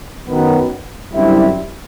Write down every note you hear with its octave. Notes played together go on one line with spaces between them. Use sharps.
F#2 D#3 F#3 B3
F#2 D3 G3 C4 E4